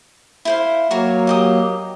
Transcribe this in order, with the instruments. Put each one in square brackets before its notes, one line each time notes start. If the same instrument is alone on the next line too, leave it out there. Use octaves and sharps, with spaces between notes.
[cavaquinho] E4 C5 F5
[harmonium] F#3 A#3 [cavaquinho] F#4 A#4 C#5
[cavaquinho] D#4 G4 D#6